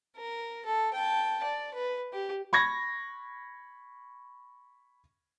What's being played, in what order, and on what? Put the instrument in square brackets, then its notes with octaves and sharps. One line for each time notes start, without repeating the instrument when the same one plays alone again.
[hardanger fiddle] A#4
A4
G5 A5
D5
B4
G4
[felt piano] B5 C#6 G#6 A#6